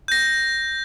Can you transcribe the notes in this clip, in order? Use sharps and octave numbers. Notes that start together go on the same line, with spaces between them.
G6 A#6